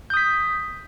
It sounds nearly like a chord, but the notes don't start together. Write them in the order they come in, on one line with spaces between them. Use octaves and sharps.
G6 D#6 B6